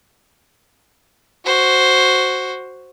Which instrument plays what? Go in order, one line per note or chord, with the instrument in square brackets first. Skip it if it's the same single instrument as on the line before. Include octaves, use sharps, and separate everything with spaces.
[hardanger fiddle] F#4 C5